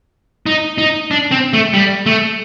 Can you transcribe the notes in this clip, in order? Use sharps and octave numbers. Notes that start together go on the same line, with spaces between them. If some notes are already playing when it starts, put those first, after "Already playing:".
D#4
D#4
D4
C4
A3
G3
A3